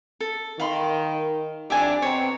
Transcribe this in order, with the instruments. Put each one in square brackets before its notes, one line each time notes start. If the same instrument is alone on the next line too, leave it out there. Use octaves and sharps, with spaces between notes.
[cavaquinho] A4
[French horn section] D#3 [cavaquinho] F5 B5 C6
[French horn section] F2 D4 [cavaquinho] G4 E5 G#5
[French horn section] B2 C4 [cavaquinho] C#5 A#5